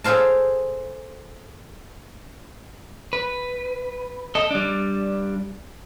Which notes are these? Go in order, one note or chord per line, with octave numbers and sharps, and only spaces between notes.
G#4 A4 C5 F5 A5
B4
A4 D#5
G3 D4